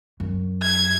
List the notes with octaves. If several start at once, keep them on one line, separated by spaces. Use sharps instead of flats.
F#2
G#6